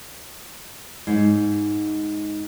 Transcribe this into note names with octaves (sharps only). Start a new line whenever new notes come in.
G#2